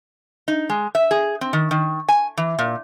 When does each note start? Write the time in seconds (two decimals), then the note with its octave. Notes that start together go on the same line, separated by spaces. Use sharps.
0.48 D#4
0.70 G#3
0.95 E5
1.11 G#4
1.41 C4
1.53 D#3
1.71 D#3
2.09 G#5
2.37 E3
2.59 A#2